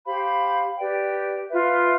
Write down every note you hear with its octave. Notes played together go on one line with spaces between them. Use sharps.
G4 C5 F5 B5
G4 B4 D5 G5
F4 B4 E5